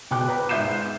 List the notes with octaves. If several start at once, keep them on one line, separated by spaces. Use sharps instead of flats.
B2 G5 D6 F#6
B4 A#5
G#2 D#4 E5 G6 C7 E7